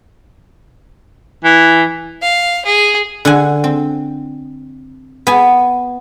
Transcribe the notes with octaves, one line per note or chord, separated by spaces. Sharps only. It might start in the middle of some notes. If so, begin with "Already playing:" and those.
E3
F5
G#4
D3 F#5 G#5
C4
B3 G#5